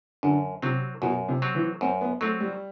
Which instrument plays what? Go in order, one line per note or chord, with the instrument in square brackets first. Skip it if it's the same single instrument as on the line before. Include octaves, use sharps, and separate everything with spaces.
[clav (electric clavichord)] F#2 [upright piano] D3
[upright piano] C3 [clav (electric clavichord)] F#3 C4
[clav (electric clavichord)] F#2 [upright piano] B2
[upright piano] C3
[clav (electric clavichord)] F#3 C4
[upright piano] E3
[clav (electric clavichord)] F#2 [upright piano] C4
[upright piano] B3
[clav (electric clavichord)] F#3 C4 [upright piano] A3
[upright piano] G3